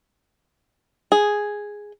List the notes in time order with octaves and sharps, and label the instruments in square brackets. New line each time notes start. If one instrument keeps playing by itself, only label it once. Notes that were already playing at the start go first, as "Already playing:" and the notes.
[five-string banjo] G#4